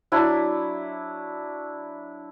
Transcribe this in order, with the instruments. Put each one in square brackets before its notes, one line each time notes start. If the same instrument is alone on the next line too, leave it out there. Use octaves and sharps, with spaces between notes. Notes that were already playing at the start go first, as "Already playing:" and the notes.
[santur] F#3 D4 E4